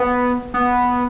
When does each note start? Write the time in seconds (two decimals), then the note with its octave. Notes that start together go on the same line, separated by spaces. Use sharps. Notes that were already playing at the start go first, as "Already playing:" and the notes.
Already playing: B3
0.54 B3